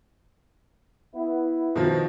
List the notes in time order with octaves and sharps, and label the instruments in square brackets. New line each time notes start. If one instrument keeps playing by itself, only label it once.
[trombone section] B3 E4
[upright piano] B2 D#3 F3